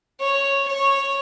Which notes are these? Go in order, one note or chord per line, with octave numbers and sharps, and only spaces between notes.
C#5
C#5